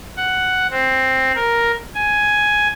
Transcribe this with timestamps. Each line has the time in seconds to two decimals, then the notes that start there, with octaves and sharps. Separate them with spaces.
0.17 F#5
0.71 C4
1.35 A#4
1.95 G#5